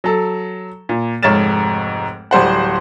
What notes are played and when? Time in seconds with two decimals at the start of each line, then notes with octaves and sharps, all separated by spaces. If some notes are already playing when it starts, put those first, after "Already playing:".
0.04 F#3 A4
0.89 A#2
1.23 F1 G#2 C#5 F6 A6 E7
2.31 D1 G3 C5 F#5